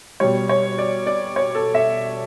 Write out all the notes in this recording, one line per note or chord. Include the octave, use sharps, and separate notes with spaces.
B2 G3 C#5
C#5
D5
D5
C#5
A4
E5